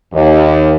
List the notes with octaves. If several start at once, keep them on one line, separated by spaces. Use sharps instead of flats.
D#2